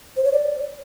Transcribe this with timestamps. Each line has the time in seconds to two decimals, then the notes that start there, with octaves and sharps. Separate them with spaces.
0.17 C5
0.25 C#5
0.32 D5